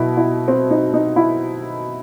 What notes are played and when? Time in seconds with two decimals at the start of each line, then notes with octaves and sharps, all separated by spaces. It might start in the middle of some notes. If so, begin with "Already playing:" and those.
Already playing: B2 F#3 E4
0.17 E4
0.48 C4
0.71 D#4
0.94 D#4
1.16 E4